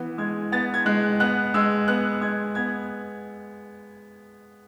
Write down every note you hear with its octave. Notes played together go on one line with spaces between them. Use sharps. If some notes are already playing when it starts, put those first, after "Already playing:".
Already playing: E3 B3
G#3 G#6
B3 A6
G#6
G#3 F#6
B3 F#6
G#3 E6
B3 F#6
G#3 G#6
B3 G#6